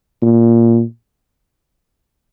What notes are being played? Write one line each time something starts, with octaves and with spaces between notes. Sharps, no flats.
A#2